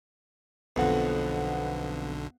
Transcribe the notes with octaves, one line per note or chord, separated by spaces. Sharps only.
B1 F2 D3 B3 F#5